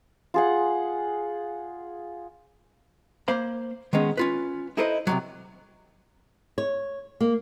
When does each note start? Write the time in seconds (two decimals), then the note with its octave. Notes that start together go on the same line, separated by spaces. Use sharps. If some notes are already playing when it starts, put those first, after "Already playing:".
0.34 F4 G#4 F#5
3.28 A#3 C5 F5 B5
3.93 D#3 G#3 B3 C#4
4.17 C#4 F4 B4
4.77 D#4 E4 A4 B4 C5 D#5
5.07 C3 D#3 F#3
6.58 C#5
7.20 A#3